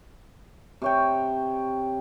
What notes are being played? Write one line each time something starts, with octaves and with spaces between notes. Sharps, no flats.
C3 C#5 G5